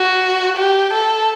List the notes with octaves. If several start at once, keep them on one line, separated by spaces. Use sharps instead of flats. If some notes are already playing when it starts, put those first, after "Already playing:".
Already playing: F#4
G4
A4